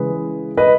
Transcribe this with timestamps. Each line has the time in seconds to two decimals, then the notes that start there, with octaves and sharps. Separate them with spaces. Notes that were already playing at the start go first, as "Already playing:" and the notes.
Already playing: C#3 E3 G#3 G#4 B4
0.57 B4 D#5